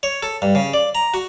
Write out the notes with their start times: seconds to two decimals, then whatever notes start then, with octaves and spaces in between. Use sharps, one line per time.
0.03 C#5
0.23 A4
0.42 G2
0.55 C#3
0.74 D5
0.95 A#5
1.14 F#4